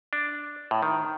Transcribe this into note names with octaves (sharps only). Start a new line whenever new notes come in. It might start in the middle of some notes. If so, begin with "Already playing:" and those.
D4
A2
D#3